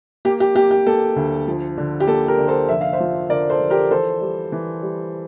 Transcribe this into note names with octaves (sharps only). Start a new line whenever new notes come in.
A#3 G4
G4
A#3 G4
G4
A#3 A4
D2
F3
D3
G4
A#3 A4
G4 A#4
D3
A4 C5
F1 E5
F5
C5 E5
F3
D3 A#4 D5
A4 C5
F3
G4 A#4
E3 A4 C5
G3
E3
G3